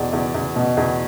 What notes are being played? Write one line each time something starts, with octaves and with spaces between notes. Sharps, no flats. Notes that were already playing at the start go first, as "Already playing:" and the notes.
Already playing: E2 B2 D5
E2
E2
B2
E2